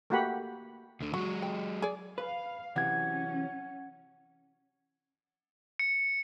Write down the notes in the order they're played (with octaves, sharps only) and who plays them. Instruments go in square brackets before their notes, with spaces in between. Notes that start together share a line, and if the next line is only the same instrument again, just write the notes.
[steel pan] A3 A#3 F#4 G4 F#5 B5
[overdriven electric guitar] D2 D3
[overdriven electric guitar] F#3 G#3 [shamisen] F#4
[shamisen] G5
G#4 D5
[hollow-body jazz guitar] B4 [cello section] F5
[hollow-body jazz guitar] C3 E3 F#3 [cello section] C#4 [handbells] F#5 G#6
[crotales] C#7